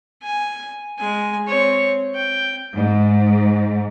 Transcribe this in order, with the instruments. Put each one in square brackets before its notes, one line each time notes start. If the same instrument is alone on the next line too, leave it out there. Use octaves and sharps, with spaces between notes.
[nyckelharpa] G#5
G#3 G#5
C4 C#5
G5
[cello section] G#2